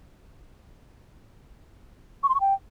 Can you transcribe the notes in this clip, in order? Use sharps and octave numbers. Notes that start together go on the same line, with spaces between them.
C#6
C6
C#6
G5